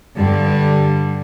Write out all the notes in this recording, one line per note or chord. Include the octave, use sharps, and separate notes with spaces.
G2 D3 G3